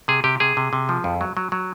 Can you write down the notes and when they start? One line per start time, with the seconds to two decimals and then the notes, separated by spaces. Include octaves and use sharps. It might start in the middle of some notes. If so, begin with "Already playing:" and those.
0.08 C3 G#4
0.24 C3 G4
0.40 C3 G#4
0.57 C3
0.73 C3
0.89 F3
1.04 F2
1.21 F#3
1.37 F#3
1.52 F#3